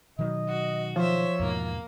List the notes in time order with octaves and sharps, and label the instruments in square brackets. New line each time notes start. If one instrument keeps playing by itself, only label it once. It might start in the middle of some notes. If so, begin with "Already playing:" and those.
[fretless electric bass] B2 D#3 F#3 [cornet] D#5
[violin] F#4
[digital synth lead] F3 [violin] C5 E5 [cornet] C#5
[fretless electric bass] E2 G#2 B2 [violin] A#3